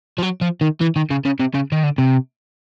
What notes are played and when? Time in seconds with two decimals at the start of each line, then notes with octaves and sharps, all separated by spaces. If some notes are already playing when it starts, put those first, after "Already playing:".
0.18 F3
0.22 F#3
0.41 F3
0.61 D#3
0.81 E3
0.96 D#3
1.10 C#3
1.25 C#3
1.39 C3
1.54 C#3
1.72 D#3
1.83 D3
1.98 C3